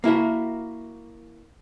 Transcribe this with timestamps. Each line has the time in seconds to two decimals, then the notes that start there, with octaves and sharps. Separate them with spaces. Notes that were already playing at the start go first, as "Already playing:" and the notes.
0.04 A#3 E4 F#4 A#4